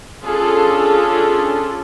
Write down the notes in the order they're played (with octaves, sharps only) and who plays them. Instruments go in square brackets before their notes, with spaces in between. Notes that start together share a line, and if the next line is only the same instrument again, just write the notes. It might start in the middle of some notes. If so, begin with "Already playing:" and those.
[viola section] C#4 D4 F4 G#4 A4